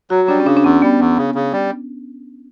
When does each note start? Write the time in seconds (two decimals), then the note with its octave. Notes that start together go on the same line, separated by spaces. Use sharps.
0.10 F#3 F#4
0.28 G3 D4
0.40 C#4
0.46 C#3 D4
0.57 D4
0.63 E2 C#4
0.82 G3 B3
0.99 E2
1.17 C#3
1.34 C#3
1.52 G3